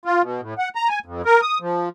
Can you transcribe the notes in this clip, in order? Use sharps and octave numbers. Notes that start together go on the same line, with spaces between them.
F4
B2
A2
F#5
A#5
G#5
F2
A#4
D#6
F3